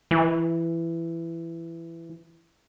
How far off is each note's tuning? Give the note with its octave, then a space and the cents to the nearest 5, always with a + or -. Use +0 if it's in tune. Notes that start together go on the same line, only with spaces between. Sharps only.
E3 +15